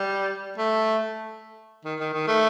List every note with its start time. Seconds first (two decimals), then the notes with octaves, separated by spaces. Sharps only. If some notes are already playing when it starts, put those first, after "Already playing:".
Already playing: G3
0.58 A3
1.84 D#3
2.00 D#3
2.13 D#3
2.27 A3